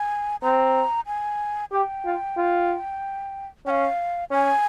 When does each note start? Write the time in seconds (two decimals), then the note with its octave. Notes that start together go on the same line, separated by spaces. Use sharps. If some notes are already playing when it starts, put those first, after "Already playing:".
Already playing: G#5
0.42 C4 A#5
1.07 G#5
1.71 G4 G5
2.05 F4
2.37 F4
3.66 C#4 G5
3.70 F5
4.31 C#4 G#5